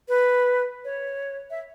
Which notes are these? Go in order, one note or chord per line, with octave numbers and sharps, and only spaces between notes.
B4
C#5
E5